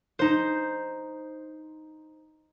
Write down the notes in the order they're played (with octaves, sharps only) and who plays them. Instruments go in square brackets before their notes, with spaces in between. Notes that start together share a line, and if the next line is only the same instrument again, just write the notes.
[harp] D#4 C5